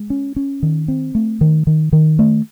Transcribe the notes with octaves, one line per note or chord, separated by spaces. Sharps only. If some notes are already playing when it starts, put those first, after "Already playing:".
Already playing: G#3
C#4
C#4
D#3
C4
A3
D#3
D#3
D#3
A3